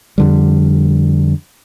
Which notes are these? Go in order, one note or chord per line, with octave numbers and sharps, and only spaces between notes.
F2 D3 G3